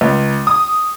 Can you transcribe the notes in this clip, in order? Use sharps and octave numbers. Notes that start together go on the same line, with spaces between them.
C#2
D#6